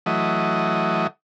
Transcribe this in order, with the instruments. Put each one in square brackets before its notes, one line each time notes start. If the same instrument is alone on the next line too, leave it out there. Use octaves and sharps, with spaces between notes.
[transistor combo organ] E3 F#3 A3 D#5